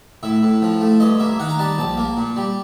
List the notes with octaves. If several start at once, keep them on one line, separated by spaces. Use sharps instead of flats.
A2 E5
A2
F3
A3
G2 D#5
A#3 E5
D#3 F#5
A#5
G3 A5
A#1 A5
A#3
A#2
G3